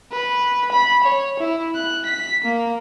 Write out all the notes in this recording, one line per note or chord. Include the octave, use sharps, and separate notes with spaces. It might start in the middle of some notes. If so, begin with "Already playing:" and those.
B4
B5
C#5
E4
F#6
B6
A#3